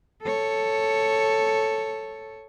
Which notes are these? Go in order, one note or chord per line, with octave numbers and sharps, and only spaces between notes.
A4 C#5